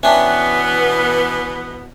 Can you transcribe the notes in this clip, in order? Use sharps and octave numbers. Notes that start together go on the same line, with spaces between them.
B2 E3 B3 C#4 D4 E5 G5 A5